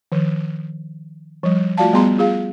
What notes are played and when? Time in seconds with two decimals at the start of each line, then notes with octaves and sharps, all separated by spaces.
0.12 D#3 F3
1.43 F3 G3
1.77 A3 F4 F#4 D5 F5 A5
1.93 G3 B3 G#4 A#5 C6
2.18 F4 G#4 F5